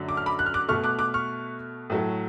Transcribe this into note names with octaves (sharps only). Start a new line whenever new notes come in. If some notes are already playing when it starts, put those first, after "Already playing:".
Already playing: F#2 D3 F#3 A3
D6
F6
B5 D6
F#6
F6
D6 F#6
B2 A3 C#6 F6
D6 F#6
D6 F#6
C#6 F6
A2 F#3 A3